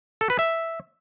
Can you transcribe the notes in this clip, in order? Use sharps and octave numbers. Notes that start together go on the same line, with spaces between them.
A4
B4
E5